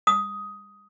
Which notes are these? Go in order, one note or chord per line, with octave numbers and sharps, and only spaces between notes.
D#6